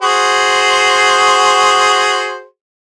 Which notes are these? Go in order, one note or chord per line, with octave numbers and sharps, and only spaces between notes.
F#4 G#4 C5